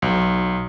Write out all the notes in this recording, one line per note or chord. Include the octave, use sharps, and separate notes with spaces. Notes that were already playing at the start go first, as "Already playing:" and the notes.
B1